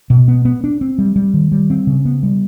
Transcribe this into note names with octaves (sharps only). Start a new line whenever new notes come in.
B2
B3
B3
D4
C4
G3
G3
D#3
G3
C4
C#3
B3
G3